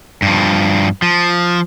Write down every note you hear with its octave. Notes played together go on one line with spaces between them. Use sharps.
G2 F3
F3